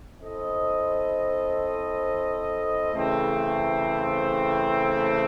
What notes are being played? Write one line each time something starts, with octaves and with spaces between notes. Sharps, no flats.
C4 E4 A4 C5 D#5
C#3 E3 A3 C4